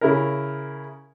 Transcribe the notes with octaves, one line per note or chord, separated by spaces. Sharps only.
C#3 E4 A#4